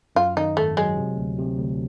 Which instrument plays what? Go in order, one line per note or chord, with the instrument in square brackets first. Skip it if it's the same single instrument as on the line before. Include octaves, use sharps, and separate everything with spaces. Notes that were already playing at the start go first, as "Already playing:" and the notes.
[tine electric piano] F#2 [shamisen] F4
[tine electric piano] D#3 [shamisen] D#4
[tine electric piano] G#1 [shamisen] A3
[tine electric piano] F#3 [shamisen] G#3
[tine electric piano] C3
D2
C3
D2